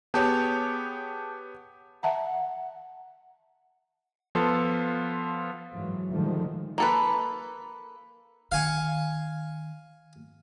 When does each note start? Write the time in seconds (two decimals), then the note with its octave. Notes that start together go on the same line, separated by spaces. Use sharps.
0.14 B3 G4 G#4 C#5 A5 G6
2.03 E5 F#5 A5 A#5
4.35 F3 B3 F4 A4 C6
5.72 G#2 E3 F#3
6.12 G#2 D3 D#3 F3 G3 A3
6.78 A#3 A4 B4
8.52 D#3 F5 G#5 C#6